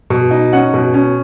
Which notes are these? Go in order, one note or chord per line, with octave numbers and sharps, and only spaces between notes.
B2
D#4
C#4 F#5
B2
C#4